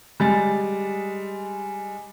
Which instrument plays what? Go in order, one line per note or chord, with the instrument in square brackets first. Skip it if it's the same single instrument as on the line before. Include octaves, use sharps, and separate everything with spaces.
[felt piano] G3 G#3 A6